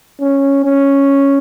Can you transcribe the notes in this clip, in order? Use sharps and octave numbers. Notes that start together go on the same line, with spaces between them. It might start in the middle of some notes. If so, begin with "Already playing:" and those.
C#4
C#4